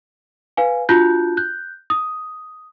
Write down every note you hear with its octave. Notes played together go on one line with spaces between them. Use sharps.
B4 F5 G#5
D4 F4 F#4 A5 F#6 G6
F#6 G6
D#6